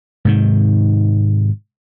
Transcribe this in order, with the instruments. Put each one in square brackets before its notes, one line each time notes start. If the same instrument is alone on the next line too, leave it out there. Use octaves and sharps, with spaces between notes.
[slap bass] G#2 C3 D#3